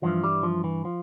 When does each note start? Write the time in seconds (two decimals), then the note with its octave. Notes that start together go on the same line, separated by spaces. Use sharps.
0.02 G2 E3 F3
0.24 G3
0.43 F3
0.64 E3
0.85 F3